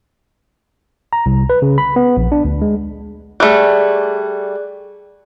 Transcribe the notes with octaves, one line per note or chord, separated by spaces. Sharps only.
A#5
C2
B4
C#3
B5
B3
A#1
D4
D2
G#3
G3 A3 G#4 D5 F#6